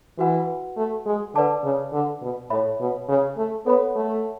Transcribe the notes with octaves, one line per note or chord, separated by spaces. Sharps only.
E3 F#4 B4 F#5
A3
G#3
D3 B4 D5 A5 D6
C#3
D3
B2
A2 C#5 E5 B5
B2
C#3
A3
B3 A4 C#5 F#5 B5
A3